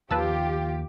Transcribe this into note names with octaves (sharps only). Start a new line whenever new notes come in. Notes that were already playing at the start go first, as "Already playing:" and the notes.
D#2 D#3 F3 F4 G4 B4 A5 E6